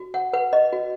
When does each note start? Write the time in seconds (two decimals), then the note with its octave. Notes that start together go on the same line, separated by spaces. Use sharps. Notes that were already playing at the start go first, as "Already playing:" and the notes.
Already playing: F#4
0.14 F#5
0.33 B4 F#5
0.53 D#5
0.73 F#4